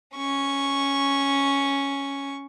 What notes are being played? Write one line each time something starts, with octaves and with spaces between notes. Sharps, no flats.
C#4 C#6